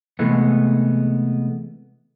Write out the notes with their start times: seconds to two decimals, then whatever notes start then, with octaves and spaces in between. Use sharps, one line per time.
0.19 C3 E3 G#3 A3 B3